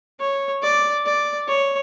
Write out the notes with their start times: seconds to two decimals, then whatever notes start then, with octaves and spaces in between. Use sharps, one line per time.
0.20 C#5
0.62 D5
1.06 D5
1.48 C#5